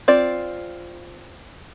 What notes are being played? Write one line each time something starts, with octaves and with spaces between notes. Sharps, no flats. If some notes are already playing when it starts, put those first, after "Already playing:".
C4 F4 D5